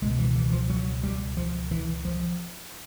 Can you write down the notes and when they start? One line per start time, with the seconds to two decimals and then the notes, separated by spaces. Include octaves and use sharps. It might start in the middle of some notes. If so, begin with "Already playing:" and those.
0.02 C#2 B2 G#3
0.19 E3
0.36 E3
0.52 F3
0.70 F#3
1.03 G3
1.37 F3
1.71 E3
2.05 F3